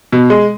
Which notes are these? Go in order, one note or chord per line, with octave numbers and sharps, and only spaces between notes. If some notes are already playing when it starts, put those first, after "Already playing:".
B2
G#3